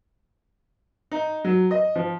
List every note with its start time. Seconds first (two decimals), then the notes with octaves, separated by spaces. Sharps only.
1.12 D#4
1.45 F#3
1.71 D#5
1.96 F3